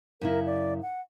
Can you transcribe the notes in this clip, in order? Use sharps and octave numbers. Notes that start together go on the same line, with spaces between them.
F#2 C#3 E4 A#4
D5
F#5